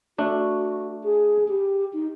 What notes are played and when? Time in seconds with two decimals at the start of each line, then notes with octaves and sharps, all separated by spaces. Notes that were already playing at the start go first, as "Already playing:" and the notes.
0.18 A3 D4 F#4
1.04 G#4
1.48 G4
1.93 D#4